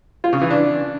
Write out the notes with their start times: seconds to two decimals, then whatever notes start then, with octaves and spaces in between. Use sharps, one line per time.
0.24 F4
0.33 C#3
0.41 E3
0.50 D4